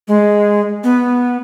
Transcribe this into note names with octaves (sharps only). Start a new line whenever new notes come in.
G#3
B3